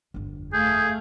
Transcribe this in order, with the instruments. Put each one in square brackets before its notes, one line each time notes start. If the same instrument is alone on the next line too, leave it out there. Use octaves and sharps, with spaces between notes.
[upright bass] G1 F2
[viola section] A3 F5 [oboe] G#4 [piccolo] G6